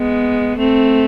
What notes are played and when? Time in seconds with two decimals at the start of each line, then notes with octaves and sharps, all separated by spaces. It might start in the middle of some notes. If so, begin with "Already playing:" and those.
Already playing: G#3 B3
0.58 A3 C4